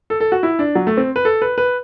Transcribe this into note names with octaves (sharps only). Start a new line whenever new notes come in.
A4
A4
F#4
E4
D4
F#3
A3
C4
B4
A4
B4
B4